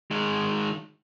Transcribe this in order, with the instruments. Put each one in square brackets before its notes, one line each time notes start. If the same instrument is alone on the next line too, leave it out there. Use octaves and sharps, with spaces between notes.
[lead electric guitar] D#3 G#3